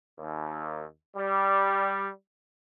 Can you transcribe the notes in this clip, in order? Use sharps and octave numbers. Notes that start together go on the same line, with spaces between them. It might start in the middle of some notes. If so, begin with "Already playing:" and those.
D#2
G3